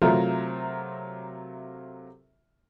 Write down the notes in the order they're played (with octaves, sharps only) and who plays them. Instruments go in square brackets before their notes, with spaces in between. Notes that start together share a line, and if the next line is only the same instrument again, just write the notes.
[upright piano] C3 F#3 A3 F4 A#4 C5